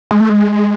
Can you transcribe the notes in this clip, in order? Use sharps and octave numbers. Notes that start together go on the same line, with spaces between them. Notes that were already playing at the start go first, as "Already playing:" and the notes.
G#3
A3
G#3